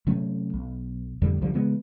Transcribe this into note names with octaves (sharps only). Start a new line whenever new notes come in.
C3 F#3 A3 C#4
B1
F2 A2 D3 G3
C2 D3 F3 G3
C#3 E3 G#3 B3